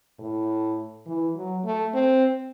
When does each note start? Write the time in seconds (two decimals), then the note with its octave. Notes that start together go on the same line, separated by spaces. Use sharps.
0.19 A2
1.06 E3
1.36 F#3
1.64 A3
1.94 C4